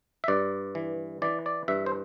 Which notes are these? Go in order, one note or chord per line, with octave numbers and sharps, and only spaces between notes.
E5
G2 D5
E3
E3 D5
D5
G2 E5
C5